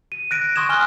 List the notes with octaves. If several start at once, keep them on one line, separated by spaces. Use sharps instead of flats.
D#7
F#6 A#6 D7
C6 C#6 D#6 G#6 E7
G#5 F6 F#6 G7